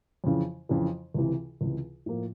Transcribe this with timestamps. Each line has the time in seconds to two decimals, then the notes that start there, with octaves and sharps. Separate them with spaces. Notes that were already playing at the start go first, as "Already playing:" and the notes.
0.24 F2 C#3 E3
0.69 F2 C#3 E3
1.14 C#2 C3 E3
1.61 C#2 C3 E3
2.06 A2 F3 A#3